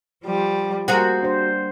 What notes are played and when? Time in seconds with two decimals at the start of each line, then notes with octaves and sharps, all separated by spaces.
0.23 F3 G3
0.88 G3 A#3 F#4 G#4 A#4 C5 F#5
1.22 D4 C5